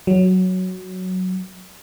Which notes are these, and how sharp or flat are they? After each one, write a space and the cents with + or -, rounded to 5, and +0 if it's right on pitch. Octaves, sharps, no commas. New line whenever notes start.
F#3 +0